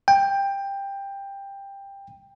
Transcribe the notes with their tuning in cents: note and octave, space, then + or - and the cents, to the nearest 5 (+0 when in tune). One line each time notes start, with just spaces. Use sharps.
G5 +15